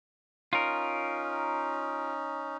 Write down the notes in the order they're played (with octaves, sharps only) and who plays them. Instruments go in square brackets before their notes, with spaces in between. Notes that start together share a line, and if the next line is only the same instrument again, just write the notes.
[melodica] C#4 D#4 [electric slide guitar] F4 A#4